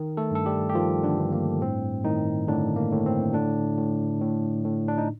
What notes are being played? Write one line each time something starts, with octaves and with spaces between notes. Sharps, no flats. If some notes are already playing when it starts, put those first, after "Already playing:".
Already playing: D#3
A3 A4
G2 A4
G3 G4
G4
D#3 F3 F4
D3 D4
G2
A#3
A2 C4
A2 D#3 D#4
A2 D3 D4
A#3
A2
C4
A2 D3 D4
A2
A2
A2
D4
D#4